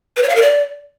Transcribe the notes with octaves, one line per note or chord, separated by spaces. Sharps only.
B4
C#5
F5
A#4
D5